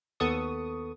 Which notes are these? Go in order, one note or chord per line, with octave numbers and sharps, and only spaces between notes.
D#2 B3 A4 C#6 D#6